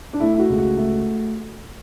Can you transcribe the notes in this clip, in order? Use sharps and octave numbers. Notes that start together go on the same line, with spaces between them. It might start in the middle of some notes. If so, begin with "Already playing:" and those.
D4
A3 E4
E4
F#4
C#2
F#4
A3